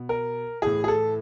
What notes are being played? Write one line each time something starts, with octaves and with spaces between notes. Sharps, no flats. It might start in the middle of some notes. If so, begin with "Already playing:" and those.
Already playing: B2
A#4
A2 E3 G#4
G#4
A4